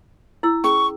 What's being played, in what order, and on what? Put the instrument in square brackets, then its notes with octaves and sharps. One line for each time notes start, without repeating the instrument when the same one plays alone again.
[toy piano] E4 E6
[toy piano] C#4 G#4 [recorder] C#6